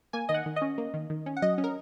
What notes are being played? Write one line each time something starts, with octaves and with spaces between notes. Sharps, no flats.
A#3 G#5
D#3 D#5
F#5
D#3
D#5
C#4
A#3
D#3
D#3
C#4
F#5
F#3 D#5
C#4
A#4